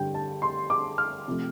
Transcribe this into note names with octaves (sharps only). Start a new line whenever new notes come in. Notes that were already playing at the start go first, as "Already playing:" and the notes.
Already playing: G2 D3 G3 G5
A5
C6
D6
F6
C3 F3 A3